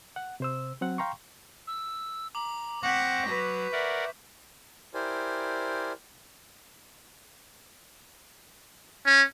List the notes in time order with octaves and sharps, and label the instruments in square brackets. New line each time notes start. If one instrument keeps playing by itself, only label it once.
[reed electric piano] F#5
C3 C5 E6
F#3 C4 F#5
F5 G5 A#5 C6 C#6
[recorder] E6
[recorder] A#5 [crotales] D6 F#7
[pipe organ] C4 [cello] F#5 [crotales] C#6 G6 B6 [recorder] A#6
[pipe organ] F#3 [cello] B4
[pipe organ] A#4 D5 F#5 [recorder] E5
[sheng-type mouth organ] E4 G4 A#4 C5 D5 G#5
[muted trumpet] C#4